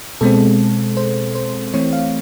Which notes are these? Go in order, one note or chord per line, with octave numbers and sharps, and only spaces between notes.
B2 G#3 C4 A4
C5
C5
E3 A3 C4 C#5
F5